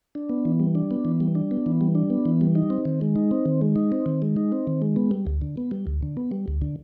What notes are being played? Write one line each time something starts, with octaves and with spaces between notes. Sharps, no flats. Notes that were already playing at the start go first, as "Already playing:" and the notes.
D4
B3
E3
G3
D4
B3
E3
G3
D4
B3
E3
G3
D4
B3
E3
G3
D#4
C4
D#3
G#3
D#4
C4
D#3
G#3
D#4
C4
D#3
G#3
D#4
C4
D#3
G#3
B3
G3
D2
D3
B3
G3
D2
D3
B3
G3
D2
D3